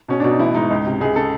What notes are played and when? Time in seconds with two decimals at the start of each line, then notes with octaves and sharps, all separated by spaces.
0.08 B2 C#4
0.20 B2 D4
0.30 D#4
0.39 A1 E4
0.54 G#2 D#4
0.70 C#2
0.86 C3
1.01 C#2 G#4
1.16 C#3 A4